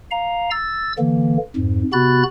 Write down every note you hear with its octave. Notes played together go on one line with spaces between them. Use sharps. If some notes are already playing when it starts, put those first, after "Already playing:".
F5 A#5
E6 A6
D3 E3 A#3
F2 G#2
C3 B3 F#4 B5 F#6 A6